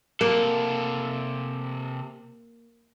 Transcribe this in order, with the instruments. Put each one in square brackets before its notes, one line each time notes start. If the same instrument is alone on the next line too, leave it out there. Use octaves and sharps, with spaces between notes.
[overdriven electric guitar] C3 A4 [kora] A#3